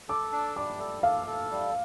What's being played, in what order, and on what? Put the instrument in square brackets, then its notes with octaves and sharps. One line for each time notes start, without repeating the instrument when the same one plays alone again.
[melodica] A4 [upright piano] D6
[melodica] D4
[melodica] G3 [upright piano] D6
[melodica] A4
[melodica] A4 [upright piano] F5
[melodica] A4
G3